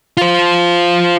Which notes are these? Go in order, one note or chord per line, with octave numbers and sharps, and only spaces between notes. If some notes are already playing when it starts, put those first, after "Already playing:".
F4 C5